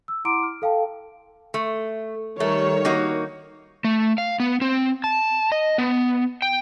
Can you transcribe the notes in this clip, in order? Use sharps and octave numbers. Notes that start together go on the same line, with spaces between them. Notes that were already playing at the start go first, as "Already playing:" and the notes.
E6
E4 F#5 A#5 C6 D6 D7
F6
A4 F5 G5 A5
A3
D#3 G3 A3 C#5
A#3 D#4 F#4
A3
F5
B3
C4
A5
D#5
B3
G5